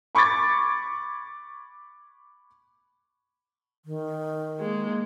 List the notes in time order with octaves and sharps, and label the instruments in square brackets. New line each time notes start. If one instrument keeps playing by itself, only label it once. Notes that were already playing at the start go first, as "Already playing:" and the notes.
[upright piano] B5 C#6 D6 G#6 A6
[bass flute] D#3
[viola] G#3 A#3